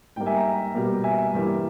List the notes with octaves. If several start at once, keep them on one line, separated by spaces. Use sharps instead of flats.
G#2 G3 A#3 G5
E5 G#5
G5 A#5
B2 G3 A#3
E5 G#5
G2 E3 G3 A#3